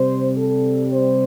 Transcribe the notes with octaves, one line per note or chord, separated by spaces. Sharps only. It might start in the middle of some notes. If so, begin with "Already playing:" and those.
Already playing: C3 G3 C5
A4
C5